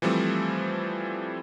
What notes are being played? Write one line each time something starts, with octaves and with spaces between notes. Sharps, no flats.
E3 F3 G3 A3 C4